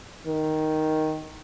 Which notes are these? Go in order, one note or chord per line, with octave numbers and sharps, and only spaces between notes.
D#3